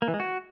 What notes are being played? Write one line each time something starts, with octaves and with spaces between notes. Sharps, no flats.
A#3
E3
G#3
F#4